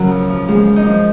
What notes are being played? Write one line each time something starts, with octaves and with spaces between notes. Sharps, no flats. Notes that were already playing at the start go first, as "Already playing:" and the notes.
Already playing: C#3 F#3 A#4
F3
F3
F3 G#3
F3
D#4
F3